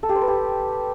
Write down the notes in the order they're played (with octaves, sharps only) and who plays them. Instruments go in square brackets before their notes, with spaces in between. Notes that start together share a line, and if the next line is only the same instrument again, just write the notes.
[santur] A4
G4
C5
B4
G4